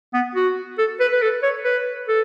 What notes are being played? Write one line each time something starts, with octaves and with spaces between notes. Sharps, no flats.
B3
F#4
A4
B4
B4
A4
C#5
B4
A4